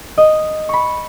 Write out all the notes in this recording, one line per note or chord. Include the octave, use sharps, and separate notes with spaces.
D#5
B5 C#6